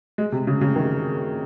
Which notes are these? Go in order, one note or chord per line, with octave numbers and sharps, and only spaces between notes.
G#3
C3
C#3
C#3
D#3